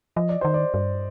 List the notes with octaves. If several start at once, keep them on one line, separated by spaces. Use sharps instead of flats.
F3 D#5
D5
D#3 C5
D5
G2